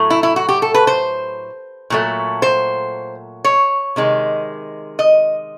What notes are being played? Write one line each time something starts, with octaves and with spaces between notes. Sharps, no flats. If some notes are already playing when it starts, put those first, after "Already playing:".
Already playing: A2 F#3 A3
E4
E4
F#4
G4
A4
B4
C5
A#2 F#3 A3
C5
C#5
C3 D#3 G#3
D#5